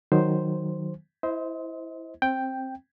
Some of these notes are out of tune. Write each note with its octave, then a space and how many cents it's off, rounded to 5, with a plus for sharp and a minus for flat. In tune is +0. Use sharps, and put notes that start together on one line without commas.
D#3 +0 F#3 +0 C5 +0
E4 +0 C5 -10 D#5 +40
C4 +15 G5 +0